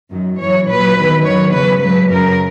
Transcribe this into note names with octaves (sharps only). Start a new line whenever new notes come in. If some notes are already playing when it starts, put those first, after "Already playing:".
F#2 D#3 F#3
F#2 E3 C#5
A#2 F#3 B4
E2 D#3 F#3
F#2 D#3 F#3 C#5
E2 C#3 F#3 B4
G#2 F#3 B4
F#2 C#3 F#3 A#4